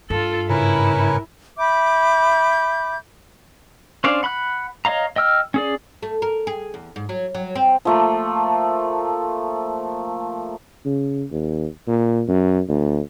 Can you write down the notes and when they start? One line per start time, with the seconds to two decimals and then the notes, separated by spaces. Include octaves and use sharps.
0.10 G2 F4 A4
0.50 G#2 C#3 C#4 E4 A#4 B4
1.58 E5 B5 D6 G6
4.04 C#4 D4 C5 D5 F5
4.23 F#5 B5 C6 F#6
4.85 C#5 D#5 F5 A#5
5.16 D#5 G5 E6 F6
5.54 C#4 G#4 D5
6.03 A3
6.22 A#4
6.47 G#4
6.74 E2
6.96 G#2
7.09 F#3
7.34 F#3
7.55 C4
7.85 F3 A3 A#3
10.85 C#3
11.31 D#2
11.87 A#2
12.28 F#2
12.68 D2